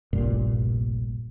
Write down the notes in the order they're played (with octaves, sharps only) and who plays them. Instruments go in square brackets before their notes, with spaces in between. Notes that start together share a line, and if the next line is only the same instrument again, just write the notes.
[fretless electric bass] F1 A#1 G2 A#2